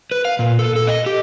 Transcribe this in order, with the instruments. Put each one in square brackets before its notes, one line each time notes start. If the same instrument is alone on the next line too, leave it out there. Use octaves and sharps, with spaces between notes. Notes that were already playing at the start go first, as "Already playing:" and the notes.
[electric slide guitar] B4
F5
A#2
A4
A4
D#5
G4